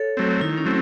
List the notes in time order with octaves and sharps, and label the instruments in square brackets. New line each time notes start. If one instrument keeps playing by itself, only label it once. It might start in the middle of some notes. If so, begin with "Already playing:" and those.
Already playing: [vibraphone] A4 C#5
[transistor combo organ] F#3 A3 C4
[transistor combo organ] D#3 [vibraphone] E4
[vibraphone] C#4
[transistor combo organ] F#3 A3 C4